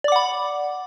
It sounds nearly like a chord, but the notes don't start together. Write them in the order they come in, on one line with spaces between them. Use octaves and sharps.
D5 D6 F#5 B5